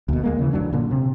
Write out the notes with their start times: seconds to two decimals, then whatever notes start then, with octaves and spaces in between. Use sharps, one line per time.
0.08 D2 B2
0.23 D#2 G#3 A#3
0.39 C#3 E3
0.53 A1 F#2 F#3 D4
0.73 A#2 D3
0.91 C3